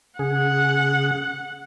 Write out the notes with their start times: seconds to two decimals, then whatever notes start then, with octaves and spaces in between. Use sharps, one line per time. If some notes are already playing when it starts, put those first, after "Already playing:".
0.19 C#3 G#4 F#5